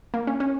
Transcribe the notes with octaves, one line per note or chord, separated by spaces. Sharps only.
A#3
C#4
C#4